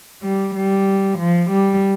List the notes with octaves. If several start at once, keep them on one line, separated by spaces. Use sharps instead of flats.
G3
G3
F3
G3